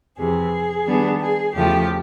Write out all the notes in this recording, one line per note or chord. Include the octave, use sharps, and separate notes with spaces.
F2 C3 E3 G#4
D#3 G3 B3 D4
G#4
E2 C#3 F3 A3 G4